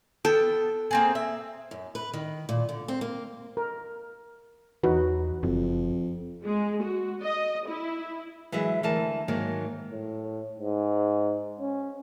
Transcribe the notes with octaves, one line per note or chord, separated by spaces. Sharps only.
B3 A4 G5
A#3 C4 G#4
E5
F#2
B4
D#3
A#2
D3
C4
A#3
A#4
E2 D#4 F#4 B4
F#1 F2
G#3
F#4
D#5
E4
E3 F#3 G#3 B4 E5
D2 E3 A#4 A5
G#2 D#3 F#3 A#3
A2
G#2
C#4